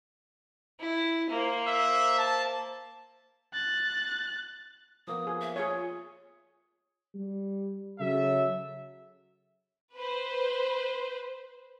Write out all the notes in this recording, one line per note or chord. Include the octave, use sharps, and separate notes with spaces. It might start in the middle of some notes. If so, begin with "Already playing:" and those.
E4
A#3 C5
E5
A5
F#6 A6
F3 A#3 B3 D#6
G#4
E5
F4 G#4 C#5 G#5
G3
C#3 F#3 A4 E5
B4 C5